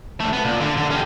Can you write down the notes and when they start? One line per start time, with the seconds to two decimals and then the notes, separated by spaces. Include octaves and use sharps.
0.20 D2 A3
0.33 B3
0.45 A#2
0.60 D3
0.77 D3
0.91 C#4 G4